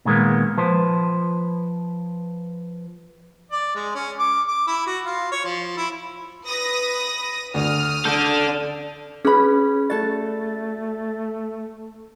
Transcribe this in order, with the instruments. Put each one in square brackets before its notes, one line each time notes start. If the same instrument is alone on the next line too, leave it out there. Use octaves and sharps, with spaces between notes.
[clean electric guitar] A#2 D#3 G#3 A#3 B3
F3 B4 C5
[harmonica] D5
G#3
C#4
D6
D6
E4
F#4
F4
C#5
F3
E4
[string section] B4 D#6 A#6
[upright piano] D2 D3 [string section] D#6 F6
[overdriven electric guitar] D4 A4 [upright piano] G6
[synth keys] C#4 [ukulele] F#4 B5 [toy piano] G#4 B4
[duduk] A3 [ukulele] F#4 A4 [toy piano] D5 [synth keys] A6